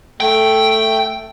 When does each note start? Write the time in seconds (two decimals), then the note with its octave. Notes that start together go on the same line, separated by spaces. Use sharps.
0.20 A3 G5